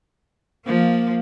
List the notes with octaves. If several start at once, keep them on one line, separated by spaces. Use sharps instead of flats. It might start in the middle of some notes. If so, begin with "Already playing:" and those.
F3 A#3